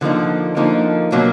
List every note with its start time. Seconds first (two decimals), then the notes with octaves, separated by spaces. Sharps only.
0.01 D3 F3 A#3 D#4
0.57 D3 F3 A#3 D#4
1.12 B2 F#3 A#3